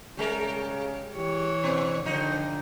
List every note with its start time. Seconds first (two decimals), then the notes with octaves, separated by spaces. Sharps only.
0.17 C#3 G3 G#3 A#4
1.16 E3 G4 C#5
1.64 B2 B3 C5
2.05 G2 D3 D#3 F3 D#4